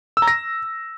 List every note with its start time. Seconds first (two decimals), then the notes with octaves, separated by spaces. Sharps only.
0.17 E6
0.22 A#5
0.27 A#6